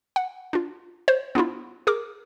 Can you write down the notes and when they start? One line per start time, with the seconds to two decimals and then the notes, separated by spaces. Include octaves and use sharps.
0.16 F#5
0.53 D4 F4
1.08 C5 C#5
1.35 B3 D4 E4 F4
1.87 G#4 A#4 D6